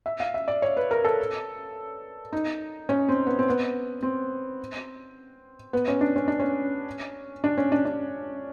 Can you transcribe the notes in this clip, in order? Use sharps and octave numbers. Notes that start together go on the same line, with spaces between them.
E5
F5
E5
D5
C#5
B4
A#4
A4
D#4
C#4
C4
B3
C4
B3
C4
B3
C#4
D4
C#4
D4
C#4
D4
C#4
D4
D4